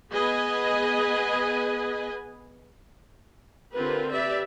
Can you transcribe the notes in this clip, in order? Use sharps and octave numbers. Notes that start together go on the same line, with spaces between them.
B3 G#4 B4 D#5 G#5
D3 C4 F4 G4 A#4 B4
G4 B4 D5 E5